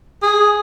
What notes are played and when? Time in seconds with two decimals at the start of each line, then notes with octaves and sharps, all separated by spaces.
0.22 G#4